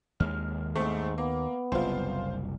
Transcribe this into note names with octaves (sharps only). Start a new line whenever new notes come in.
D#2 G#3 F6
D#2 G#2 A3 C4
A#3 B3
F#1 C2 F4 C5